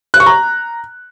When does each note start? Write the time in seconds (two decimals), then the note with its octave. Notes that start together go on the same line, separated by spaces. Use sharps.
0.14 F#6
0.20 C#6
0.26 A#5